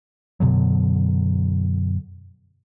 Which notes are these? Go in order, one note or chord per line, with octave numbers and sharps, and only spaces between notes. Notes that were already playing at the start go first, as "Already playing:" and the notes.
F#2 B2 D3 F#3